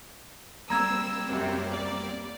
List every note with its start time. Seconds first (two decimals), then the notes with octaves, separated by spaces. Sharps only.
0.70 G3 A#3 C4 A#5 B5 E6 G#6
1.27 F#2 C3
1.71 D5